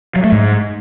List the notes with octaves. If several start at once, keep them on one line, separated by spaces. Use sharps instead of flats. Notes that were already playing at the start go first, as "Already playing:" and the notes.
F#3
A3
G#2